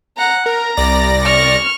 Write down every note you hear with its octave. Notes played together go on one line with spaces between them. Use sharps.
F#5 A#5
A#4 A#5
C2 D5 A#6
C#6 F6